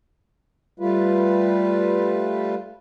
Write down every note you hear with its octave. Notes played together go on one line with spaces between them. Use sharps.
G3 A3 F4 B4